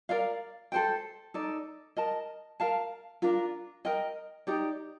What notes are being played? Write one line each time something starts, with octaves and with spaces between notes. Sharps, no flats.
A#4 D5 F5
A4 C5 G5
D#4 A4 D5
A#4 D#5 A5
A#4 F5 A5
D4 F4 A#4
A#4 D#5 G5
D#4 G4 D5